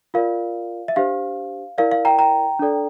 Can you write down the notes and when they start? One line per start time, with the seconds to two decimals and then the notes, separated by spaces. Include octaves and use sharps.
0.14 F4 A#4 D5 F5
0.88 E5
0.96 D4 G4 C5 F5
1.78 E4 A#4 D5 F5
1.92 F5
2.05 G5 A#5
2.19 G5 A#5
2.59 D4 A4 D5